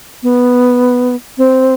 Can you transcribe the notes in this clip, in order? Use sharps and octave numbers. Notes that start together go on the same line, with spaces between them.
B3
C4